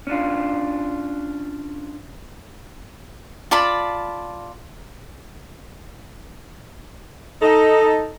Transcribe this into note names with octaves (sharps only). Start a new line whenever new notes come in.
C#4 D4 F4
F4 D5 A5 B5
D#4 A4